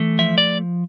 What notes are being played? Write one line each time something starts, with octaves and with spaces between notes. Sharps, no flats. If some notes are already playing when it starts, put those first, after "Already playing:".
Already playing: E3 A3
F3 E5
D5